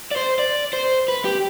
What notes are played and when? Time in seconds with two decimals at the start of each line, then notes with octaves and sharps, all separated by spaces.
0.11 D5
0.16 C5
0.39 D5
0.73 C5
1.08 B4
1.25 G4